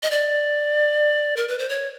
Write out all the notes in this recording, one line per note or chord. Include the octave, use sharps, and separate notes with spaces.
D#5
D5
A#4
B4
C5
C#5